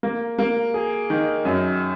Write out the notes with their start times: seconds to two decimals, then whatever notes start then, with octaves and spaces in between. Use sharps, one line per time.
0.03 A#3
0.39 A#3
0.74 G#4
1.10 D#3
1.45 F#2